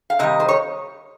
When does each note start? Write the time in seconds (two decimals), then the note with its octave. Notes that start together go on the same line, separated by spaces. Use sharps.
0.10 F5
0.19 C3 D#3 G3 D#5
0.40 C5
0.48 C#5